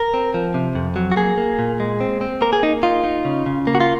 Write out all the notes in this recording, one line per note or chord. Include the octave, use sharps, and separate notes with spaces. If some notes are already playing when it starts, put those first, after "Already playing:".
Already playing: A#4
C4
F3
C3
F2
F#3
F#4
A#3 G#4
A#3
A#2
G#3
C4
C4
A#3 A#4
G#4
A#3 D#4
D#4 F4
D#4
C#3
C#3
A#3
F#4
F4